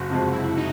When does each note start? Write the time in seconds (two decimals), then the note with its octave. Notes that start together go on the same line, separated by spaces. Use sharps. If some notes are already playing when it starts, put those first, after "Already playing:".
Already playing: F#1 F#4
0.10 F2 C3 F3 G#3
0.33 F#1 E4
0.57 D#4